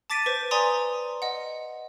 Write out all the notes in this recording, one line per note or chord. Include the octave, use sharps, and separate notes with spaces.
A5 D6 A6 B6 D7 D#7
B4 C5
D5 G#5 A#5 C6 D#6
D#5 F#5